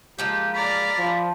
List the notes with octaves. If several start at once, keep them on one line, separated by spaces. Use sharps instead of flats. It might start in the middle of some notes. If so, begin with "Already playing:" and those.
F3 G#3 A#3 G4
D5 A#5 B5 F6
F3